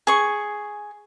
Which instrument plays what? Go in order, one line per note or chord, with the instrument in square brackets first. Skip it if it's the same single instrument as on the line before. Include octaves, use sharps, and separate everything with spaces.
[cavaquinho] G#4 C#6